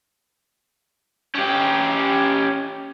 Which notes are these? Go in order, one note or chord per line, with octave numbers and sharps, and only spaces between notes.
C#4 G4